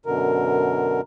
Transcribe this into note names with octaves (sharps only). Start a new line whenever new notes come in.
F#2 B2 D3 A#4